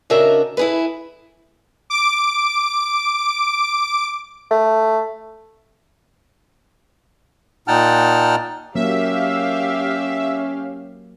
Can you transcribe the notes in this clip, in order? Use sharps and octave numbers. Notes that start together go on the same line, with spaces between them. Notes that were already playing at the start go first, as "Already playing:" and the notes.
C#3 D4 D#4 F#4 A#4 E5
E4 G#4 B4
D6 D7
A3
A#2 D#4 F#5 G5 A5 F6
F#3 A#3 C#4 G4 E5 F5